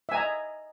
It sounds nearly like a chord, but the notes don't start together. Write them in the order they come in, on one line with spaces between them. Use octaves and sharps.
E5 G#5 A#5 D#5